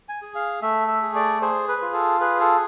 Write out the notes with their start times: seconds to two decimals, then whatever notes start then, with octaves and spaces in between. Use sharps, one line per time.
0.09 G#5
0.22 G#4
0.35 F5
0.62 A3 E5
0.88 E5
1.02 G#4
1.15 D5
1.41 G#4 C5
1.68 B4
1.82 F4
1.94 A4
2.21 G#4 B4
2.40 A4